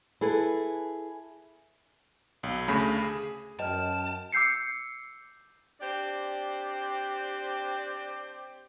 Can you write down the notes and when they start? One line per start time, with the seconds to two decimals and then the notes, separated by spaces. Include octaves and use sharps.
0.21 E4 G#4 A4 B4
2.43 B1
2.68 D2 C#3 A3 B5
3.02 G#4
3.59 F#2 B4 D#5 G5 A5 F6
4.32 D6 E6 G6 C7 C#7
5.81 C4 D4 G4 C5 D5